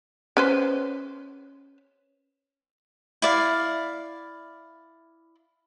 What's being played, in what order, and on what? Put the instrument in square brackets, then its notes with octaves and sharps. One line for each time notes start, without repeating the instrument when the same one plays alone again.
[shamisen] C#4 B4 C5
[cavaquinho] E4 D5 F5